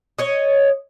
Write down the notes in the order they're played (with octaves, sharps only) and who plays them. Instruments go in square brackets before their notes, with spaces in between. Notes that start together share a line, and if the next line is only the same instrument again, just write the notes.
[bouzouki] C#5 D#5